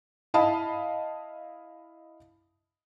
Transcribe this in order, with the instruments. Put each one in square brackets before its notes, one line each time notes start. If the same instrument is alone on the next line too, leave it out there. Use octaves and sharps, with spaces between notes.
[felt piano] E4 D#5 F5 A5 B5 D#6